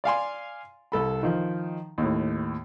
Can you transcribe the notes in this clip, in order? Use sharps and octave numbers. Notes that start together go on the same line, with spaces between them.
D5 F5 G#5 C6
C2 A4 B5
D#3 F3
D#2 A2